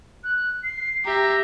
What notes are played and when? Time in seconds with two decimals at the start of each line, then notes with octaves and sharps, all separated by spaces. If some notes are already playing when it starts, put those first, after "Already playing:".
0.24 F#6
0.63 C7
1.05 G4 E5 A#5